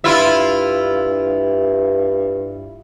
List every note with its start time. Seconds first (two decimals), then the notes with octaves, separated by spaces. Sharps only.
0.04 G2 E4 F4 E5